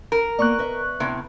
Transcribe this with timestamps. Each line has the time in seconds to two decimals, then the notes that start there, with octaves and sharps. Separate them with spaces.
0.12 A#4
0.39 A#3 B3 D5 C#6 F#6
0.58 B4 D#5 E5
1.00 A2 C3 B3